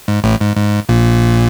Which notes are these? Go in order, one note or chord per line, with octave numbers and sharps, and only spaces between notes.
G#2
A1 A2
G#2
G#2
A#1 A#2